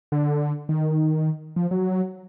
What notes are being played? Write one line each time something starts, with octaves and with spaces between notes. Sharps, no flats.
D3
D#3
F3
F#3